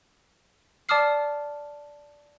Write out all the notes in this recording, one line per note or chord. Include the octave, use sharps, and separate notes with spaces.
D5 A5 D6 D#6 F6 C7